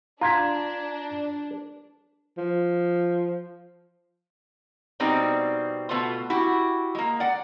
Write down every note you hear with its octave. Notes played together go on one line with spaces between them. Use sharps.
D4 F4 A#5 G#6 B6
F3
B2 G3 C4 D#4 D5
B2 A3 B3 F4
E4 F#4 G4
G#3 A#3
D5 F#5